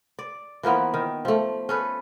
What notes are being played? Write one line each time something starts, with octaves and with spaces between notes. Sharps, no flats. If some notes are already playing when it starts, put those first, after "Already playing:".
D5
E3 F3 A#3 B3
D#3
F3 A3
C#4 A4 B4